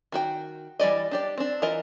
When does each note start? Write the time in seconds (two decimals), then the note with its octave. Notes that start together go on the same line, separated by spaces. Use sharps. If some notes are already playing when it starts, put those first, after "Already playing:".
0.12 D#3 F#4 G5
0.79 E3 G3 D5 D#5
1.11 D4 G4 D5
1.37 C4 D4
1.62 E3 F4 A#4 D#5